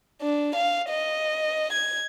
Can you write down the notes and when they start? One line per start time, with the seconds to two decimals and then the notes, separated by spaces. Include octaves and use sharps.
0.22 D4
0.56 F5
0.90 D#5
1.73 G#6